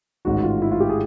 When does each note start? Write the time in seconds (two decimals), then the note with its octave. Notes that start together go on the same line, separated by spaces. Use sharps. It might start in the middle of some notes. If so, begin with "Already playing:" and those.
0.25 A1 G#2 D#3 F#4
0.43 F4
0.62 E4
0.72 F4
0.80 G4
0.89 G#4